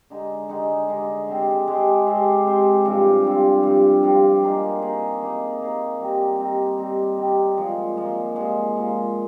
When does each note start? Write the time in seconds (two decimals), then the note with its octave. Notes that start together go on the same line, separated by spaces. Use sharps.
0.10 D3 G#3 D#4
0.49 D3 G#3 D#4
0.88 D3 G#3 D#4
1.28 G#3 C4 G4 C5
1.67 G#3 C4 G4 C5
2.07 G#3 C4 G4 C5
2.46 G#3 C4 G4 C5
2.85 G2 F3 C4 F4
3.24 G2 F3 C4 F4
3.63 G2 F3 C4 F4
4.03 G2 F3 C4 F4
4.42 A#3 D#4 G#4
4.82 A#3 D#4 G#4
5.21 A#3 D#4 G#4
5.61 A#3 D#4 G#4
6.00 G3 C4 D#4
6.39 G3 C4 D#4
6.78 G3 C4 D#4
7.17 G3 C4 D#4
7.57 A#2 F3 G#3
7.96 A#2 F3 G#3
8.35 A#2 F3 G#3
8.75 A#2 F3 G#3